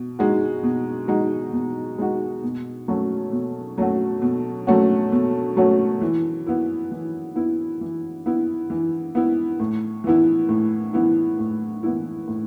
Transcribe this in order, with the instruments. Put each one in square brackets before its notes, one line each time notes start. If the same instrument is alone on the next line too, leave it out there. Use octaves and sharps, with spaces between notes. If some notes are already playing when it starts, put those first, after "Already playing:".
Already playing: [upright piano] B2
G#3 D#4 F#4
B2
G#3 D#4 F#4
B2
G#3 D#4 F#4
B2
F#3 A3 C#4 F#4
B2
F#3 A3 C#4 F#4
B2
F#3 A3 C#4 F#4
B2
F#3 A3 C#4 F#4
E3
B3 E4
E3
B3 E4
E3
B3 E4
E3
B3 E4
A2
E3 B3 E4
A2
E3 B3 E4
A2
E3 B3 E4
A2